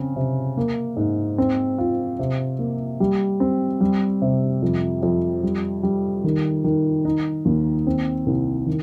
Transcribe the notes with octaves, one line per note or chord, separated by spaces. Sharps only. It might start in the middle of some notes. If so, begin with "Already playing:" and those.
Already playing: C#3 C4
C3
A#3
G#2
C4
F4
C3
A#3
G3
C4
G3
C3
F2
F2
G3
G3
D#3
D#3
D#4
D#2
C4
C2
D#3